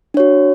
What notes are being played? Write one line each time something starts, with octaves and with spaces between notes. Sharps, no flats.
D4 F#4 C#5